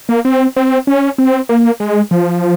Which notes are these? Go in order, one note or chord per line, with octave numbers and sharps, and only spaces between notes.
A#3
C4
C4
C#4
C4
A#3
G#3
F3